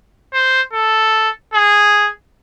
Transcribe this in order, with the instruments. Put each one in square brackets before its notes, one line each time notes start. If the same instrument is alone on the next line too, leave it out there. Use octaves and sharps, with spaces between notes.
[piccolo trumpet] C5
A4
G#4